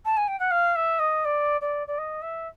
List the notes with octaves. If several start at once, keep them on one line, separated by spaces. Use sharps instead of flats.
A5
G#5
G5
F#5
F5
E5
D#5
D5
D5
D5
D#5
E5